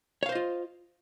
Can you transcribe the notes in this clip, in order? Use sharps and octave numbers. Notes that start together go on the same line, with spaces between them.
F4 C5 C#5 D#5 F5